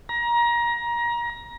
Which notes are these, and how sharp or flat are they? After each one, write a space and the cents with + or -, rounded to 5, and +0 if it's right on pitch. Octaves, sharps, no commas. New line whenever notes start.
A#5 +25